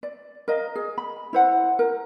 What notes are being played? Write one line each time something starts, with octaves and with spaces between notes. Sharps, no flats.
D5
A#4 D#5 F5
G#4
B5
E4 C5 F#5
A#4